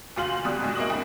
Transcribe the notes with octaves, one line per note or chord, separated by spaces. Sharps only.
F#1 D2 F4 F5 C6 F#7
D2 G3 D#6 F#6
D2 G#2 B2
A#3 E4 D#5 C#6 D#6 F#7
F1 G2